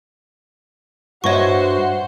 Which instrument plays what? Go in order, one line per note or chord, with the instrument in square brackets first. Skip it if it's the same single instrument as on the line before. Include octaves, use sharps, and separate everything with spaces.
[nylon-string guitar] G2 D#5 E5 [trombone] F#4 [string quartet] C5 F#5 [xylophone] C#5 C#6